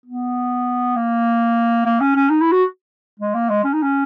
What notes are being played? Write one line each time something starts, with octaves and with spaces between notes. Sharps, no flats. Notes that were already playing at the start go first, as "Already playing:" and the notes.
B3
A#3
A#3
C#4
C#4
D#4
E4
F#4
G#3
A#3
G#3
C#4
D#4
C#4